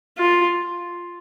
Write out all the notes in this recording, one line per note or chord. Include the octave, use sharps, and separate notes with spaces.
F4